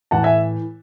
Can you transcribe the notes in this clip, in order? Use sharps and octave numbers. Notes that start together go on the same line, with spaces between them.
A2 E3 F#5 A5
E5 G#5